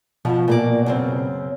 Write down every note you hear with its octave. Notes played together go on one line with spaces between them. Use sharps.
B2 F3
A#2 A#3 D5
F#2 C#3 C4